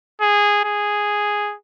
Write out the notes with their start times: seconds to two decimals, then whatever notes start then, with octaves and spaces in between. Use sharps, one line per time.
0.21 G#4
0.65 G#4